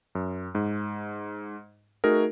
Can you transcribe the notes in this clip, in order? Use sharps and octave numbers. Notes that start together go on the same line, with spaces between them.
F#2
G#2
A3 D#4 F#4 G#4 A#4